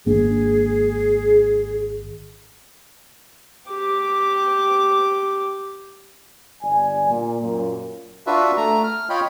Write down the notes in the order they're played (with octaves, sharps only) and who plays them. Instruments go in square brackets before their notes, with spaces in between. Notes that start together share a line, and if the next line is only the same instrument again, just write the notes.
[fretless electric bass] G#1 A#3 D4 [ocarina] G#4
[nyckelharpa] G4 D6
[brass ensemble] G1 D5 G#5
A#2
F#2 A#2
[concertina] D4 F4 F#4 B4 E5
A3 A#5
F6
F4 C#5 D#5 G5 B5